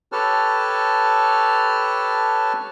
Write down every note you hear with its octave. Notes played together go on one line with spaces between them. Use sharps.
G4 A4 B4 C#5 A5 F6